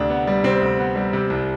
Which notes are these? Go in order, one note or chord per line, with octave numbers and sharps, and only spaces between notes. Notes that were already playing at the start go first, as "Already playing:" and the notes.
Already playing: D2 C3 D4
B3
G3
C3 C4
D2
B3
G3
C3
C2